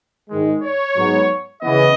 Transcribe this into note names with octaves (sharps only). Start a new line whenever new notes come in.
G#2 D#3 G#3
C#5
G#2 F#3 B3
C#3 E3 B3 D#5